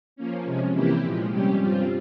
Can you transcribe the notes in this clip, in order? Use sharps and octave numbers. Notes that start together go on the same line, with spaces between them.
F3 A#3 C#4
C3 F3 G#3 C#4
C3 E3 A#3 E4 G4
A#2 F3 G#3
C3 G3 C#4 G4
G2 G3 C4 F4